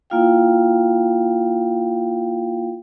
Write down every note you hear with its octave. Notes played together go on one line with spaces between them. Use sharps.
A#3 E4 F4 F5 G5